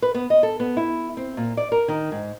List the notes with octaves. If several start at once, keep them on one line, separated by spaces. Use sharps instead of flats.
B4
B3
D#5
A4
B3
E4
C4
A#2
D5
A#4
D#3
G#2